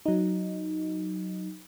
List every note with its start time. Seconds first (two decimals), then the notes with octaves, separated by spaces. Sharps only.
0.06 F#3 D#4